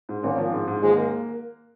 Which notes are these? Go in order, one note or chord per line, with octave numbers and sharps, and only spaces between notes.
G#2
G#1 A#3 C#4
F3
G#2
G#2
D#2 F3 G#3
A#3